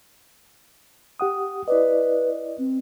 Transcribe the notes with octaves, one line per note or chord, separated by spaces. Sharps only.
G4 F#5 D#6
E4 B4 D5 D#5
C4